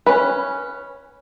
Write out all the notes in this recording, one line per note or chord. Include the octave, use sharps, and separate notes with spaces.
C#4 B4